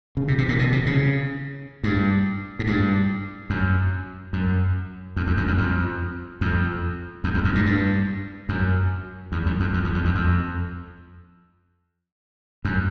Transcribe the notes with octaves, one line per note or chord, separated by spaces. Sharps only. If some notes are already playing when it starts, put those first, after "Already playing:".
C#3
C3
C3
A#2
B2
C3
C#3
G2
G#2
G2
F#2
F#2
F2
F2
F#2
F#2
F2
F2
E2
F2
F#2
G2
G2
F#2
E2
F#2
F2
F2
E2
F2
F2
F2
F#2